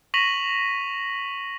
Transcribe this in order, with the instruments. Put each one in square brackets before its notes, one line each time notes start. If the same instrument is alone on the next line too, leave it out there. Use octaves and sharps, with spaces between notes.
[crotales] C#6 A#6 B6 D#7 F7 F#7